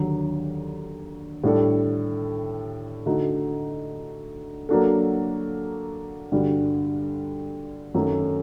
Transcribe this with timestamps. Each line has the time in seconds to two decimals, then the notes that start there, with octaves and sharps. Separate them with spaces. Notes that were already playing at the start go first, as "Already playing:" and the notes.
Already playing: D#2 D3 F#3
1.44 A2 G3 D4 A4
3.06 D3 A3 D#4 F#4 A4
4.69 F#3 A#3 D4 F#4 A4
6.32 G2 D3 G3 D4 F#4
7.94 F#2 D#3 F#3 A3